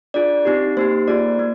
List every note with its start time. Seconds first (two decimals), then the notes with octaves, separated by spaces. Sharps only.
0.14 D4 F4 G#4 D5
0.45 C4 D#4 G4
0.77 A#3 D#4 G4 C5
1.08 A#3 F4 G#4 D5
1.39 A#3